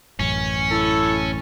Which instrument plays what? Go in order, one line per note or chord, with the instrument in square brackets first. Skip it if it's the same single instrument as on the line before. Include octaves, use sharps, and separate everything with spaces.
[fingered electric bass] A1 F#2 [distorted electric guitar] C#4
[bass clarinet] E4 [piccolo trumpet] A4